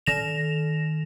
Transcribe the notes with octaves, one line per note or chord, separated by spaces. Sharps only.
D#3 A#6 E7 F7